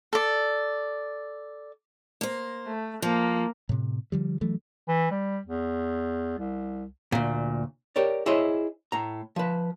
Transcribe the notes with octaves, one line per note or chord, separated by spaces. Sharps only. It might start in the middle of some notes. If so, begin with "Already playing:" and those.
A4 D5
A#3 C5
A3
F3 A#3
A2 C3
D3 F3 G3
E3 F#3 A3
E3
G3
E2
C2
D2 A#2
G4 A#4 C#5 D5
E4 G#4 C5 C#5 D#5 E5
A2 A#5
F3 B4